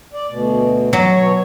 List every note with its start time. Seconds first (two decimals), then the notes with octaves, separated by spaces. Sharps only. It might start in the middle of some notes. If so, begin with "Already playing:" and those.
0.13 D5
0.29 D2 B2
0.93 F#3
1.14 B2 C#5